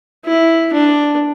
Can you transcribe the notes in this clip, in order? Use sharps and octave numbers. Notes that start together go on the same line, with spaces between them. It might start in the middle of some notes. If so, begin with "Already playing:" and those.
E4
D4